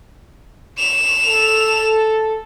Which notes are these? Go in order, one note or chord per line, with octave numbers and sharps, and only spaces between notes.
E7 F7
A4